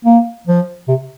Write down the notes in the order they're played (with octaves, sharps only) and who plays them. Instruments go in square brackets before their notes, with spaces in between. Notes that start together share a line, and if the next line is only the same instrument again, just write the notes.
[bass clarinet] A#3
F3
C3